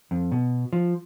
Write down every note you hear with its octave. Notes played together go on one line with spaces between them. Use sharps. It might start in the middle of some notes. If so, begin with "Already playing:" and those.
F2
B2
F3